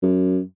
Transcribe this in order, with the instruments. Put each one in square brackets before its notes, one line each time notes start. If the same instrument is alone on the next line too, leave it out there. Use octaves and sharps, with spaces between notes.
[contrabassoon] F#2